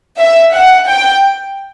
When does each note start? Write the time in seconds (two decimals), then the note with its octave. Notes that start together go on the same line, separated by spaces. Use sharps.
0.20 E5
0.54 F#5
0.88 G5